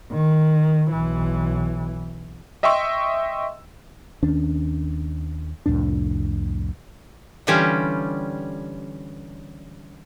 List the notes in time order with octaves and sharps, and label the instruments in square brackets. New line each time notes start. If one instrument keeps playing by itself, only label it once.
[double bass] D#3
B1 E3
[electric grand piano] D#5 E5 G5 C6 C#6 E6
[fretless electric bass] D#2 D#3 C#4 D4
C2 F2 A2 D4
[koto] D3 E3 G3 C#4 F4 G4